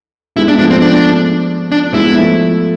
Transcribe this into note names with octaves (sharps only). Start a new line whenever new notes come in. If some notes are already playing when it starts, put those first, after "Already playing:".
G#3 B3 E4
D4
F3 A3 D4
C4
D4
D4
G#3 B3 E4
F3 A3